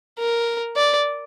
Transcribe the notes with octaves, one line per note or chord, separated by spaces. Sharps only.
A#4
D5